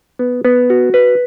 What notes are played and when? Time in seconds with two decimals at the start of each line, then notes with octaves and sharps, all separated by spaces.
0.19 B3
0.45 B3
0.70 F#4
0.94 B4